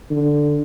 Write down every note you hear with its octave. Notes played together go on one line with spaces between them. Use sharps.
D3